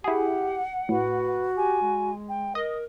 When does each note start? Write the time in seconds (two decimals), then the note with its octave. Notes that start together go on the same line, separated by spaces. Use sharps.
0.04 E4 G4 G#4 F#5
0.89 A2 F#4 B4
1.57 G4 G#5
1.82 G#3
2.29 G5
2.55 A#4 D#5